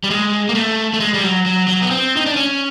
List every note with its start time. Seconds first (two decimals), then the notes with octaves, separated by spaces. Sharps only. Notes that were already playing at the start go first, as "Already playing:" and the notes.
0.04 G3
0.10 G#3
0.49 A#3
0.55 A3
0.93 A3
1.00 G#3
1.14 G3
1.23 F#3
1.46 F#3
1.68 F#3
1.82 B3
1.91 C4
2.17 D#4
2.26 D4
2.36 C#4